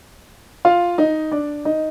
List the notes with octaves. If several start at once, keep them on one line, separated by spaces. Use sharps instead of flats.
F4 F5
D#4 D#5
D4 D5
D#4 D#5